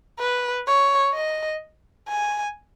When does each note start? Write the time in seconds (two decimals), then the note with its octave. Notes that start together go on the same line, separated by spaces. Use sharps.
0.19 B4
0.67 C#5
1.14 D#5
2.09 G#5